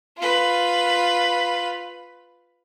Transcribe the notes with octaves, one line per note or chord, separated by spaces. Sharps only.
F4 B4